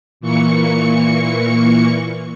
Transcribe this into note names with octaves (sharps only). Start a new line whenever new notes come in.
A#2 E3 A#3 C#6 C#7